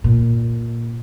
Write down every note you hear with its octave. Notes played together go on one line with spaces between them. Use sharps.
A#2